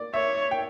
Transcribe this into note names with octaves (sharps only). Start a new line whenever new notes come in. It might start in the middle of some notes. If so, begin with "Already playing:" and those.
Already playing: D5
C#5 E5
G5